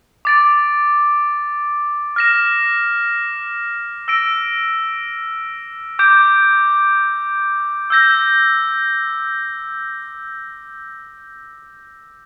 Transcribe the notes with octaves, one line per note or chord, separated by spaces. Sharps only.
D6 A6 D7
F6 A#6 E7
E6 A#6 D7
D6 G6 D7
E6 G6 A#6